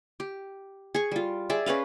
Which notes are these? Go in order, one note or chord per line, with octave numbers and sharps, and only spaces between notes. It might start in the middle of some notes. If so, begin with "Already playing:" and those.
G4
G#4 C#6
G3 F4
G#4 D5 E5
C#4 G#4 B4 F5